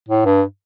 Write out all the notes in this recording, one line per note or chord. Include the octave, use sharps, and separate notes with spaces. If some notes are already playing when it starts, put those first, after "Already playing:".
A2
G2